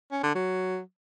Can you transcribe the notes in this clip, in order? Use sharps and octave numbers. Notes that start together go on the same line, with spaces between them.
C#4
D3
F#3